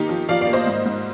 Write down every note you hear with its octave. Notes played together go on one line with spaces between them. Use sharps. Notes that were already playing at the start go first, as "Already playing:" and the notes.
Already playing: D#3 A#3 D#4 G4
F3
F3 D5 F5
D5 F5
A#3
C5 D#5
G#2
G#2